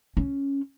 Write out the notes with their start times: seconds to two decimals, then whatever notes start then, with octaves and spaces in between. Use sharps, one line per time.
0.17 C#4